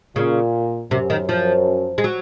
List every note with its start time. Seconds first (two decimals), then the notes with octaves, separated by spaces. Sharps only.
0.16 A#2 C#3
0.91 F#2 C3
1.10 D#3
1.29 F3
1.98 G#3
2.04 F#3